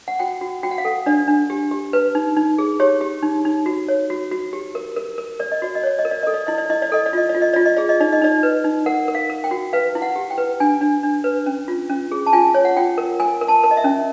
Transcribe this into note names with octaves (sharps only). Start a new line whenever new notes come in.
F#5
F#4 G5
F#4
F#4 G5
F#5
F5
A4 F#5
D4 D5
D4
G4
G4
B4
D#4
D#4
G#4
G4 C#5
G4
D#4
D#4
F#4
C#5
F#4
F#4
G4
A#4
A#4
A#4
A#4 D5
D#5
F#4 D5
D#5
C#5 D5
D#5
A#4
D5
A4 D#5
D5
E4 D#5
D5
E4 D#5
D5
A4 D#5
D5
F4 D#5
D5
F4
D#5
F4 D5
D#5
G#4 D5
D#5
D#4 D5
D#5
D#4 D5
B4
D#4
A#4 F#5
A#4
F5
A#4
G5
F#4
B4 F5
E4
F#5
G4
G5
B4
D4 G#5
D4
D4
B4
C#4
F4
C#4
G#4
A5
F4 G#5
C#5
F#5
F4 G5
A#4
A#4 G#5
A#4
A5
A#4
D#5
E5
C#4